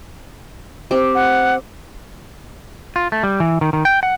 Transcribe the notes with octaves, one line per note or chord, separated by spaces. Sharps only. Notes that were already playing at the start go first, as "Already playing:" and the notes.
C4 G4
F#5
F4
A3
G3
E3
D#3
D#3
G5
F#5